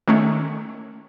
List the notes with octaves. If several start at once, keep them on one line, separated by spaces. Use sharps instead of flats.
D#3 A3 C#4